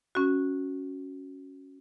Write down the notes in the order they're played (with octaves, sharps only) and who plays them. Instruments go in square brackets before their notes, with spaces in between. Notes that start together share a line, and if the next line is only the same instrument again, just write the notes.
[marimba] C#4 F#4